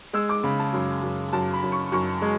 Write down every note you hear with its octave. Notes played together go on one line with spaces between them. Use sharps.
G#3 E6
D6
C#3 B5
A5
F#2
F#2
F#2 A5
B5
F#2
C#6
F#2 C#6
G#3